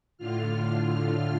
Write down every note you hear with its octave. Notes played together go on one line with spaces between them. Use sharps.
A2 D3 F4 F6